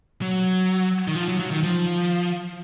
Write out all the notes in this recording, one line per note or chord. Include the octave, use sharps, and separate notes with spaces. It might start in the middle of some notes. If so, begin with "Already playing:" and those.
F#3
D#3
F3
F#3
F#3
D#3
F3